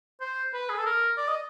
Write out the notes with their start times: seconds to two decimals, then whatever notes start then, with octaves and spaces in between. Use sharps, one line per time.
0.21 C5
0.54 B4
0.69 G#4
0.78 A4
0.86 A#4
1.17 D5
1.28 D#5